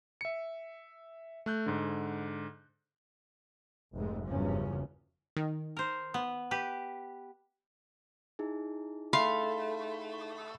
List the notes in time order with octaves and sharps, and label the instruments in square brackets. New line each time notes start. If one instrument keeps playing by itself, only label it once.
[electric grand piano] E5 C#7
A3 F#6 G6
G#2 D3
[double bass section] F1 G#2 C3 G#3 A3
F#1 E2 G2 C#3 F3 C#4
[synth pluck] D#3
[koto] A#4 C5
B3
G4 B4
[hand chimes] D#4 E4 G#4
[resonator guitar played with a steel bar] A3 [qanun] F5 [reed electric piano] B5 C6